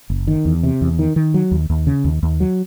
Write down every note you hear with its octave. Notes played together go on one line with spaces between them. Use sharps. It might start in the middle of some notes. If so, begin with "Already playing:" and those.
F#1
D#3
E2
C3
E2
D#3
D#3
F#3
D#2
D#2
C#3
D#2
D#2
F#3